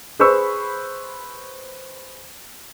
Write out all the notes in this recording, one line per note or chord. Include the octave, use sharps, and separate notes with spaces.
G#4 B4 C5 B5 C#6 E6